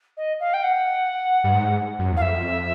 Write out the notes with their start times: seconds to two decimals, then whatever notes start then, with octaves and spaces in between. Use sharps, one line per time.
0.17 D#5
0.40 F5
0.53 G5
0.64 F#5
1.44 G2
1.54 G#2
1.99 F#2
2.12 E2 F5
2.22 F2 E5